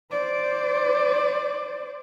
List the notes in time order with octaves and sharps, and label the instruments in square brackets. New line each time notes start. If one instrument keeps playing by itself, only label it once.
[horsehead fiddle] C5 D5